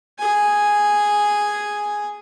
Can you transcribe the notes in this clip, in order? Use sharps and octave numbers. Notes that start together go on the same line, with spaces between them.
G#4 G#5